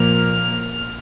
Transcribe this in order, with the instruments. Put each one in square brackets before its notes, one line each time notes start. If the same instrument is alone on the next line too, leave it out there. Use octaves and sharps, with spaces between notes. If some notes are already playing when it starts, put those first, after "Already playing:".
Already playing: [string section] A#2 F3 A#3 F6